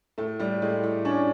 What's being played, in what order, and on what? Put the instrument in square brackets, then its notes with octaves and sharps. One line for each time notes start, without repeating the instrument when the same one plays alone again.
[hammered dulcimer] A2 [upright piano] A3
[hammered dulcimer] A2 [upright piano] G3
[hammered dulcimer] A2 [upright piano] G#3
[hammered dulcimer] A2
[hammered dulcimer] C#4 [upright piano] D4